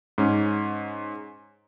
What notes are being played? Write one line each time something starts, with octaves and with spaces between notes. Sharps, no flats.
G#2 C#4